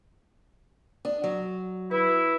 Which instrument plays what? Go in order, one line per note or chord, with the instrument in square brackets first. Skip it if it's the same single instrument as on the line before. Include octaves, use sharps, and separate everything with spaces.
[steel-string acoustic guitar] D4 [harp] D#6
[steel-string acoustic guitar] F#3
[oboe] E4 [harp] B4